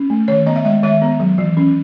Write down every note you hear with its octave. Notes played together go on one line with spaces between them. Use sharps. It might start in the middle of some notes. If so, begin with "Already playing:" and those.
Already playing: C#4
A3
D#3 C#5
B3 D#5
E5
G#3 D#5
D#3 E5
B3
F#3
E3
C#4